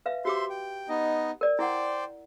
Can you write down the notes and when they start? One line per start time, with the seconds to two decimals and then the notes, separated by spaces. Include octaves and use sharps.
0.06 B4 E5 F5
0.25 F#4 G4 C5 E5 C6 D6
0.50 G5
0.89 B3 D#4 D#5
1.41 A#4 D5
1.59 E4 C5 D5 F#5 G5